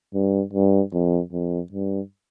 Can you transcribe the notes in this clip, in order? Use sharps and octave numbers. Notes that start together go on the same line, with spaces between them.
G2
G2
F2
F2
G2